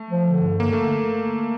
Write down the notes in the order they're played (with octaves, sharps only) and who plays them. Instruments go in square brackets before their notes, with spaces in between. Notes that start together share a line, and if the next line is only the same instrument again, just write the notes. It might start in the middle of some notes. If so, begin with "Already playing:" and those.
Already playing: [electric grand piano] A3
[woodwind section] F3
D3
G2
[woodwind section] D3 [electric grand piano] A#3
[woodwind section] D3 [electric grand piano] A3